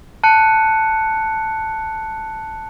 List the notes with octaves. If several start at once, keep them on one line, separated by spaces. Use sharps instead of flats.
A5 F#6 C#7